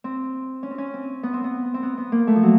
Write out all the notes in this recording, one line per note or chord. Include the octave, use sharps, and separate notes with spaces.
C4
C#4
C4
C#4
C4
B3
C4
B3
C4
B3
B3
A#3
A3
F3
F#3